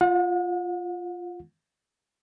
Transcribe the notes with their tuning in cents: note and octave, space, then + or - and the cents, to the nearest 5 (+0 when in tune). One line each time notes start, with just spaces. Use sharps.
F4 +0 F#5 -40